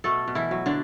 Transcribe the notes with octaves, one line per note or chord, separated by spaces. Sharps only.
B2 A3 A4
B2
E3 E4
F#3
D3 D4